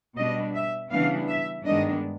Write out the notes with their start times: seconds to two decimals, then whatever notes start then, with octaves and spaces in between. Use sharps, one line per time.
0.16 B2 G3 B3 D4 D#5
0.55 E5
0.91 C#3 E3 G3 B3 D4 F5
1.28 E5
1.65 G2 D#3 G#3 B3 D4 D#5